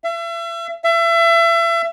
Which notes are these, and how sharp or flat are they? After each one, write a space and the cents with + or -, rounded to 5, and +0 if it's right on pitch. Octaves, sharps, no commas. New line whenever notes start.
E5 +35
E5 +30